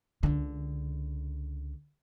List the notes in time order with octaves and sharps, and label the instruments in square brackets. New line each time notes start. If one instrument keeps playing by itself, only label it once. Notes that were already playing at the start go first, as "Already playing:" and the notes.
[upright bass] C#2 D3